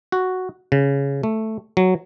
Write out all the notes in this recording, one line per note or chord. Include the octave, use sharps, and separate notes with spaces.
F#4
C#3
A3
F#3